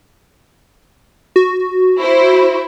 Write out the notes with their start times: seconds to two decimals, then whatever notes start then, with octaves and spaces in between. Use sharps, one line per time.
1.36 F#4
2.01 E4 C5